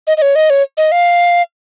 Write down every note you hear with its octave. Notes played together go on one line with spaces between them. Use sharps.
D#5
D#5
C#5
D#5
C#5
D#5
F5